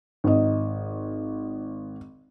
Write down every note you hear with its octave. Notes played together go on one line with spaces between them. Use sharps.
G#1 D#5